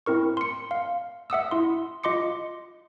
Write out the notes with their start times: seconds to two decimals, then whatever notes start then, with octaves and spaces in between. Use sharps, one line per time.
0.06 C4 E4 A#4 C#6
0.37 C6 C#7
0.71 F5
1.30 E5 F#5 D#6 E6
1.51 E4 C6
2.04 F4 D#5 C6 D6 C#7